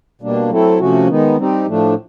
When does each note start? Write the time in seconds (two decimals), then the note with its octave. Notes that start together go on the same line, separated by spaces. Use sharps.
0.21 B2 G3 A#3 D4
0.49 F#3 A3 C4 E4 A4
0.79 C3 F3 A3 C#4 F#4
1.08 D#3 G#3 B3 D#4
1.36 G3 C4 D#4 G4
1.66 A2 F3 A3 D4